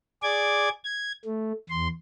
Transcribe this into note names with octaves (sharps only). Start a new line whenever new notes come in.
G#4 D5 D6 G#6
G#6
A3
E2 C6